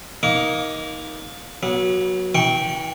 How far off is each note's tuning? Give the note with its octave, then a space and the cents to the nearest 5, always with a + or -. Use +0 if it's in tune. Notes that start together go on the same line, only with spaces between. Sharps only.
A#3 +15 D#4 +15 D6 -35
F#3 +0 B3 -35
E3 -35 G5 -5 C#6 -15